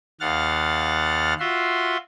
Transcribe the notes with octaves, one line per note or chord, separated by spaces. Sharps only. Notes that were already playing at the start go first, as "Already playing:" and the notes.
D#2 F5 F#5 F6 A6
F4 F#4 E5 C6